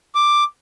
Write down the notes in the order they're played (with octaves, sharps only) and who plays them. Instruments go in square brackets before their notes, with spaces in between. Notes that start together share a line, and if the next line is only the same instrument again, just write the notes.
[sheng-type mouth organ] D6